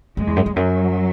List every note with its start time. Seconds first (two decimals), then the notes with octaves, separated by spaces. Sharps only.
0.17 F#2 G#3
0.27 E2
0.36 F#2
0.46 E2
0.56 F#2 F#3